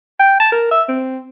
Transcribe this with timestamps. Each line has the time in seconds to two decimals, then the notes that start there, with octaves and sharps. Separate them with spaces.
0.19 G5
0.40 A5
0.52 A#4
0.71 E5
0.89 C4